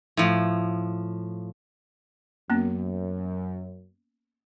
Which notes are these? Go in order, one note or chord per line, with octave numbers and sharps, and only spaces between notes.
A2 F3
F#2 A#3 B3 C#4